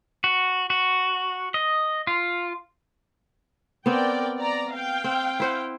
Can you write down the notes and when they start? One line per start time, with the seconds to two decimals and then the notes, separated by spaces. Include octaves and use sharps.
0.24 F#4
0.70 F#4
1.54 D#5
2.07 F4
3.86 B3 C4 A#4 D5 G5
4.37 D5 A#5
4.73 F5 G5
5.04 C4
5.40 E4 C5 F#5